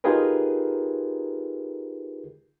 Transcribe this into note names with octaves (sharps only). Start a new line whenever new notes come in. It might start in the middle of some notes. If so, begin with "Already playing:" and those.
D#4 F4 G4 G#4 A#4 B4